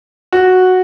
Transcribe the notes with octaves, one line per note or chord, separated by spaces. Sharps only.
F#4